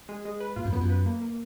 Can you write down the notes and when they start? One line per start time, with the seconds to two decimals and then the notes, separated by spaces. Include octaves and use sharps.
0.09 G#3
0.25 G#3
0.40 B4
0.56 A#2 F4
0.65 F#2
0.73 F2 B3
0.80 F#2
0.90 B4
1.06 A#3
1.22 A#3